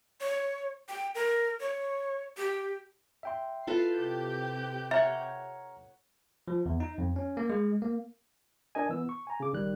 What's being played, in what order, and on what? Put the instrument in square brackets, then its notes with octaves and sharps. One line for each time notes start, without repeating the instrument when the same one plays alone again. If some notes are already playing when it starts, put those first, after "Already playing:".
[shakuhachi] C#5
G5
A#4
C#5
G4
[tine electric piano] E5 G5 C6
[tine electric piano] E4 [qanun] F4 A4 B4 [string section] C7
[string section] C3 G4 G6
[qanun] C#5 F#5 [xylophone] E5 [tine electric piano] A#5 F6
[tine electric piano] F3
E2
D#4
F2
C#4
A#3
G#3
A#3
D4 A#4 D#5 G#5
E3 B3 E6
C#6
G#5 A#5
C#3 D6
A1 D#3 G3 D#4 F#6